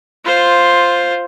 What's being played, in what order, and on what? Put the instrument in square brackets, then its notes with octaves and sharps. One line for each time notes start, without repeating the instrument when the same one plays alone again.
[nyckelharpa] F4 C5